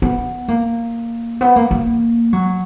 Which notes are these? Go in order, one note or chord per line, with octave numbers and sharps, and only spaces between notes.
B3
A#3
B3
A#3
A#3
F#3